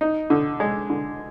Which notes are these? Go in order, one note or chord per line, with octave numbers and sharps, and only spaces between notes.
D#4
D3
G#3
D3